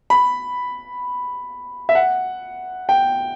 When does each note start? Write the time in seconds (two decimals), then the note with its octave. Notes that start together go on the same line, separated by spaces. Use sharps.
0.10 B5
1.89 E5
1.95 F#5
2.89 G5